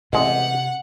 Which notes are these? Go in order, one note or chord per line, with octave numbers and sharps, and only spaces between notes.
A1 E2 C3 G#3 F#5